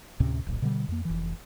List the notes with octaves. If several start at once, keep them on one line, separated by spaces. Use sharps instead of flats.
D2 A2 C3 C#4
D1 A#1
B2 D3 G3
F2 A#3
F1 E3